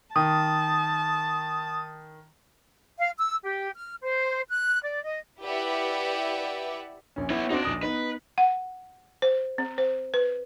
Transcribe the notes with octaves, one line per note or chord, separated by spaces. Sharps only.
D#3 A5 D#6
F5
E6
G4
F6
C5
F#6
D5
D#5
E4 G4 B4 D5 E5 F#5
A#1 C#4
B3 E4 C#5
C4 D4 D#4 F#4 D5
A#1 D#6 A#6
B3 D#4 B4
F#5
C5
C4
C5
B4